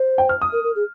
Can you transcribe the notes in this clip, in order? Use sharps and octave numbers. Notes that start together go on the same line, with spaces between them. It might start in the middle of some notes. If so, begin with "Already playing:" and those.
Already playing: C5
G5
F6
D#6
A#4
A#4
G#4